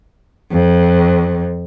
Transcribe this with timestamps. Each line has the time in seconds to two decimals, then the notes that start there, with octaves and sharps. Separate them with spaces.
0.52 F2